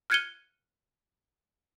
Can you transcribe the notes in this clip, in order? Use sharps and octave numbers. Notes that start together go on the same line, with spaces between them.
F6 F#6 G#6 C#7 D#7 G7